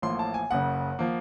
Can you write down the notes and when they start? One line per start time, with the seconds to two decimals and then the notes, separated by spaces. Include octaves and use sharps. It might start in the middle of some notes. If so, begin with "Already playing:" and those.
0.02 A1 A2 F3 A#3 C6
0.19 A5
0.34 G#5
0.51 F#1 F#2 C#3 F#5
0.99 F3 A#3